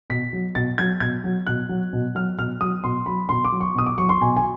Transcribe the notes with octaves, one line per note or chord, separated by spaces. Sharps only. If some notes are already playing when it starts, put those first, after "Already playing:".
B2 B6
F#3
B2 A6
F#3 G#6
B2 G#6
F#3
B2 F#6
F#3
B2
F#3 F6
B2 F6
F#3 D#6
B2 C6
F#3 B5
B2 C6
D6
F#3
C#6
B2 D#6
D6
F#3 C#6
C6
B2 G#5
G#5